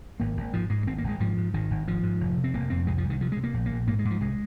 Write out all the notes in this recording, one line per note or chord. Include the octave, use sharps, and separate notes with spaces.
G#1 A#3
G#1
G#2 F3
G#2 G#3
G#1 C4
A#3
G#1
G#3
G#2 F3
G#2
G#1 D#3
G#1
G#2 F3
G#2
F1
C3
C4
F1 A#3
F2 C4
C2 G#3
F3
C2
D#3
C3 F3
G#3
C3
A#3
A#1
A#3
A#1
G#2 A#3
G#3
G#2
F3
C2 G#3